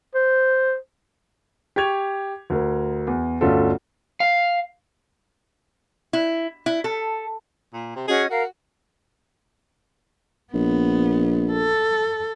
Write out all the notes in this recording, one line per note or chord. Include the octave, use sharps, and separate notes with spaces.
C5
G4 C#6 G#6 F7
D2 A#4
E2
G1 D2 C#4 F4 A4
F5
E4
E4
A4
A#2
C3
C#4 F#4 G#4 D#5
F#4 A#4 F5 A#5
A#1 B3
A4